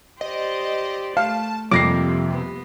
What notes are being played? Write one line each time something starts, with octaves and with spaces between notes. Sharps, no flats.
G4 C5 D5 D#5
A3 F5 A5
F2 C3 G3 A#3 D6 A#6 C7
B3